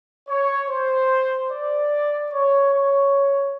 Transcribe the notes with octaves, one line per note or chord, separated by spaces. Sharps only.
C#5
C5
D5
C#5
C#5